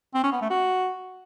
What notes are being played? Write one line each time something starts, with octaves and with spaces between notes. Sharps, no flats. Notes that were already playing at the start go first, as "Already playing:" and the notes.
C4
C#4
B3
A3
F#4